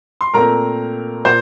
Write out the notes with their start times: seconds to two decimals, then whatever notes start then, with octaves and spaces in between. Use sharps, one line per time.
0.21 C6
0.34 A#2 A3 C4 A#4 A#5
1.25 A#2 C5